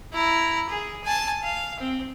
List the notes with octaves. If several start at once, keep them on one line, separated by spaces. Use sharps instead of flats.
E4 A#5
G#4
G#5 A5
F5
C4